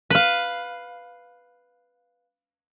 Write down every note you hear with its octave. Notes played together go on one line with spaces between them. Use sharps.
B4 F5